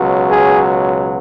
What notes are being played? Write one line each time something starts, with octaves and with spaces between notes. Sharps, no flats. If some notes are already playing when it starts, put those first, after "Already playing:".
Already playing: C#2 B2 F#3
G#4